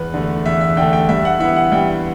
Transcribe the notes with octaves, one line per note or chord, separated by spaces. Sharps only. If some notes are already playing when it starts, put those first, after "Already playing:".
Already playing: E2 B4
D3 A3
E2 E5
E5
D3 A3 G5
G5
G2 E5
F#5
E3 B3 E5
F#5
G2 G5